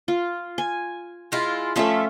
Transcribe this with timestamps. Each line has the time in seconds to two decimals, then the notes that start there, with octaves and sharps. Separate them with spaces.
0.08 F4
0.58 G#5
1.32 G#3 E4 F4
1.76 F3 A3 C#4 F4 A4 E5